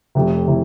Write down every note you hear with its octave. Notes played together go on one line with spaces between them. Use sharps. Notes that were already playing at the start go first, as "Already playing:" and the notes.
F1 F2 C3
C3 E4